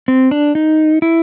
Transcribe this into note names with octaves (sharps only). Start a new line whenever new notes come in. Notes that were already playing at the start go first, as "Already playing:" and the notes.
C4
D4
D#4
E4